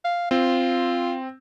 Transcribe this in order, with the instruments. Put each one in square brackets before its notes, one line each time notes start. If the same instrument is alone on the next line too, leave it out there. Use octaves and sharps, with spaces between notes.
[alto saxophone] F5
[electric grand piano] C4 [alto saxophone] F4